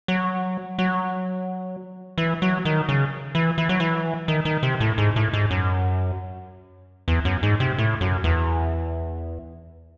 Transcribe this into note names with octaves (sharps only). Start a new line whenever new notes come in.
F#3
F#3
E3
F#3
D#3
C#3
E3
E3
F#3
E3
D#3
D#3
C3
A2
G#2
A2
G#2
F#2
E2
F#2
G#2
C3
A2
F#2
E2